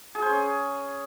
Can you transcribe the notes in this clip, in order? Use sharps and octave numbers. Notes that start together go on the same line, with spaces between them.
G#4
C5
C#4